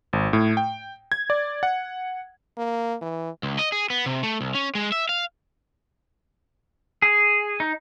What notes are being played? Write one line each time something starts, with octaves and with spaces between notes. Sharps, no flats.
G#1
A2
G5
G#6
D5
F#5
A#3
E3
C#2
D#5
G#4
B3
C3
A3
C2
C#4
G#3
E5
F5
G#4
D#4